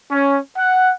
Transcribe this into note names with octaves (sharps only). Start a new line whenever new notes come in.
C#4
F#5